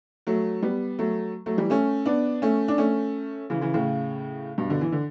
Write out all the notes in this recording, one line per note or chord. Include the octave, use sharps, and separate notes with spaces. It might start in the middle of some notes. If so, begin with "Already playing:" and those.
F#3 A3
G3 B3
F#3 A3
F#3 A3
E3 G3
A3 C#4
B3 D4
A3 C#4
D4
A3 C#4
C#3 E3
C#3 E3
A2 C#3
G2 B2
B2 D3
E3
D3